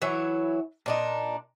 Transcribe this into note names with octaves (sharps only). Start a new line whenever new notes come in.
E3 F#3 E4 C#5
A#2 D4 D#4